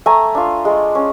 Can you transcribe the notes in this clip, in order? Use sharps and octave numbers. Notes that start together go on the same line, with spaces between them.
A3 G#5 A#5
D4 F4
G#3
C#4